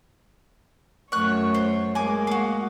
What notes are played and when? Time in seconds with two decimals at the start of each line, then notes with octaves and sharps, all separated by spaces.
1.12 F#2 A3 C#5 C#6 F#6
1.54 C5
1.95 G#3 A#3 G#5 D6
2.27 F#4 F5